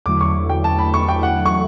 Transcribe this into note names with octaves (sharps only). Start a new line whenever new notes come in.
E2 D3 F#3 A3 E4 D6
C#6
G5
A5
B5
C#6
G5
F#5
C#6